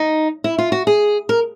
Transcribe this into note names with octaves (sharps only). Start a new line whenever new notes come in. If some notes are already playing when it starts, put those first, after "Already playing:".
Already playing: D#4
E4
F4
F#4
G#4
A#4